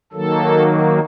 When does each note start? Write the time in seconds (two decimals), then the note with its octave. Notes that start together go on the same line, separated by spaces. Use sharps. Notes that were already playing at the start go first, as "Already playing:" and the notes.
0.13 D#3 F#3 A#3 A4